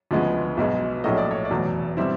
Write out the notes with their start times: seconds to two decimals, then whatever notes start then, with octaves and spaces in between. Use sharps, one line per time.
0.11 D2 C#3 F3 G#3 B3
0.57 B1 B2 G#3
1.04 A#1 A2 F#3 A3 C#4 D#5
1.18 D5
1.31 C#5
1.45 D5
1.50 F1 E2 B2 F#3
1.97 B2 G3 C4 E4